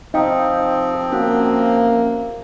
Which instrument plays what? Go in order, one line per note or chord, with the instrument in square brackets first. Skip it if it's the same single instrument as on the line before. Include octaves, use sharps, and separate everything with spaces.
[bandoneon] C3 F3 C4 [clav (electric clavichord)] D#4 [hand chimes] F5 G5 D#6
[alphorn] A#3 [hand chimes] C#4 [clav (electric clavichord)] F#4